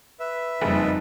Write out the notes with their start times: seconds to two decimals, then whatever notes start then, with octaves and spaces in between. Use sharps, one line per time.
0.20 B4 E5
0.61 F#1 F2 G3 D#4